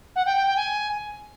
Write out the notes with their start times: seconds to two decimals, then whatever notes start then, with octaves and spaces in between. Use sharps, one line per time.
0.16 F#5
0.26 G5
0.36 G5
0.46 G5
0.57 G#5